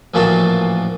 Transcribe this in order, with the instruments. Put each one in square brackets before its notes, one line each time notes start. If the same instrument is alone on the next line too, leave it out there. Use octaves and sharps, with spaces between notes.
[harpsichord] A1 A#2 F3 F#4 A4 A5